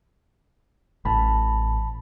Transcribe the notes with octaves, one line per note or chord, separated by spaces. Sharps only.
A1 A5 B5